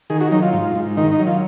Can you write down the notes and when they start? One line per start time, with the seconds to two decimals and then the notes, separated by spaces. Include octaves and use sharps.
0.10 D#3 G#4
0.21 F#4
0.31 F#3 D#4
0.42 F4
0.53 G#2
0.75 G#2
0.97 D#3 D#4
1.11 D#4
1.19 F#3
1.27 F4